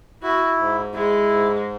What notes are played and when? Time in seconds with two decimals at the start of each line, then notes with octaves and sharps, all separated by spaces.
0.23 E4 F#4
0.57 G#2
0.93 G#3 E4
1.29 G#2